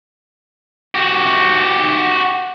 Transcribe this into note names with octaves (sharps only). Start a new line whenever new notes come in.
F#4 G4